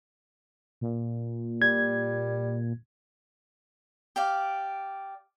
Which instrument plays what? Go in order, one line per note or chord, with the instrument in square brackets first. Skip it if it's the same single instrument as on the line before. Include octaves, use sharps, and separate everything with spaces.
[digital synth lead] A#2
[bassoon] G3 [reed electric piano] G#6
[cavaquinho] G4 D5 F5